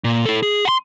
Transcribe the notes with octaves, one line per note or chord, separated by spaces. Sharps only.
A#2
E4 A4
G#4
F#5 C6